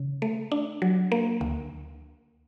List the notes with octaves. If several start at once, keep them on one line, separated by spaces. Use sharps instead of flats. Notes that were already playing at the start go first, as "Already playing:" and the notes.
Already playing: C#3
A3
D4
F#3
A#3
D2